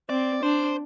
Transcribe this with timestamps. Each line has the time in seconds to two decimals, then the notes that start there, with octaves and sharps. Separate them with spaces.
0.10 C4 D5
0.43 D4 C5